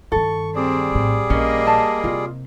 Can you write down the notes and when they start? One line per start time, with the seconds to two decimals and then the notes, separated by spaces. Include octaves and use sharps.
0.12 G2 D#3 A4 C#6
0.55 G3 C4 G#4 D5
0.91 A#1 A2
1.30 A#1 A#2 A#3 C#4 D#5
1.67 A5
2.04 C3 F4